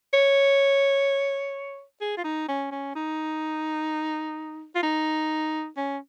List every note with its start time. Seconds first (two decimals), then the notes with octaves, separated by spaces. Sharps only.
0.13 C#5
2.01 G#4
2.17 F4
2.24 D#4
2.48 C#4
2.71 C#4
2.96 D#4
4.75 F4
4.83 D#4
5.77 C#4